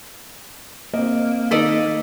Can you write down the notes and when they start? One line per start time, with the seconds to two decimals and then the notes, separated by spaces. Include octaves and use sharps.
0.94 A#3 C4 D#5
1.51 D#3 A4 A#4 D5 D#5 B6